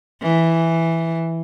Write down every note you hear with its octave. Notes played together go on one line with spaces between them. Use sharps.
E3